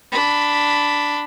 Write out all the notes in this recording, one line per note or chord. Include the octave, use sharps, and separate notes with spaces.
D4 B5